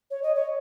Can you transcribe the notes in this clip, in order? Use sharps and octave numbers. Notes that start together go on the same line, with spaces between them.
C#5
D#5
C#5